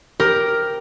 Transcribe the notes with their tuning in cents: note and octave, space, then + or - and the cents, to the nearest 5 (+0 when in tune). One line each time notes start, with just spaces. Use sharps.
G4 +0 A#4 +5